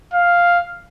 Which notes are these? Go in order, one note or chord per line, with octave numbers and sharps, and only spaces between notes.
F5